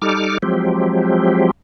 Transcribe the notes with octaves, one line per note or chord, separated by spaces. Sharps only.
G3 D#4 A4 D6 F6
F3 F#3 G#3 C4 G4